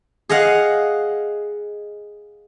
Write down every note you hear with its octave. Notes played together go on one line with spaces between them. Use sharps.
G#4 D#5 F5 F#5